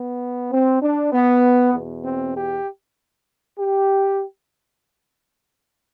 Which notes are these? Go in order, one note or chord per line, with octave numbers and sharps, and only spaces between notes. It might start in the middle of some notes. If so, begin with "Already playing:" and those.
Already playing: B3
C4
D4
B3
E2 B2
C4
G4
G4